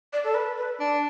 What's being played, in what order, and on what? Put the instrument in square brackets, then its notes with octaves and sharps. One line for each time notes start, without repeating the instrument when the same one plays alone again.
[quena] D5
A4
B4
B4
[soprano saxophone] D4